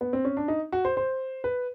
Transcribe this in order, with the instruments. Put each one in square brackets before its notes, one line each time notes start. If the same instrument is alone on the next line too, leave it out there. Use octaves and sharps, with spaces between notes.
[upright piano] B3
C4
C#4
D4
D#4
F#4
C5
C5
B4